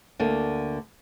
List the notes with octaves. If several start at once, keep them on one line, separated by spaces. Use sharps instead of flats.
D2 D3 A#3